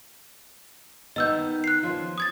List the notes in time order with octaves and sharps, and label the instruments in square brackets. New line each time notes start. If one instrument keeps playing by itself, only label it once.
[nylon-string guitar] D#3 B3 [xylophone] D#5 E6 G6
[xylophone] F#6 C7
[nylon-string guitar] F3 C#4 F4
[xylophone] D#6 G#6 A6